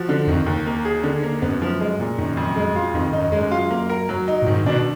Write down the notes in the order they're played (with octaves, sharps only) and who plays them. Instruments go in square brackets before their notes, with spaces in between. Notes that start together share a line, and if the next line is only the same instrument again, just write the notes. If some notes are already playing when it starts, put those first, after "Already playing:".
Already playing: [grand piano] F3 F#4
D3
[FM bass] F2 [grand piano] D#3
[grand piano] D#2
A#3
G#4
D3
A#3
[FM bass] F#2 [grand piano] B3
[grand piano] F3
G#3
A#2
[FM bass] F#2 [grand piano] D#3
[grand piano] F2
G#3
F4
[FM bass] F2 [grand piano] D#3
[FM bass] F#2 [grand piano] D#4
[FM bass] F#2 [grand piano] G#3
[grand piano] F4
A#3
A#4
F#3
D#4
[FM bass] A#2
[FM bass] G#2 [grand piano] D#3
[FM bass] B2 [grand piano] D4